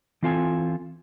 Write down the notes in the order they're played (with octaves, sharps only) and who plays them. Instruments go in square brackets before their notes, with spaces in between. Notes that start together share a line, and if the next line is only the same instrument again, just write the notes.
[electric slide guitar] E3 C4 F4 A4 G5 G#5